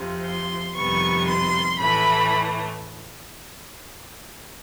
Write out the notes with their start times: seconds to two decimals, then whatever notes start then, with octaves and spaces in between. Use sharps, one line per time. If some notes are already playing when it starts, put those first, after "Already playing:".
Already playing: F2 C3 F3
0.24 C6
0.74 F2 C3 D#3 G3 B3 C#6
1.26 C6
1.78 A2 E3 A3 B5